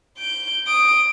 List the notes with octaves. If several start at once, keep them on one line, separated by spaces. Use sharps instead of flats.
G6 D7
D#6 D7